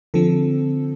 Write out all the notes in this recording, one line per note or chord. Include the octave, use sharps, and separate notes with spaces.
D3 F3 C4 A4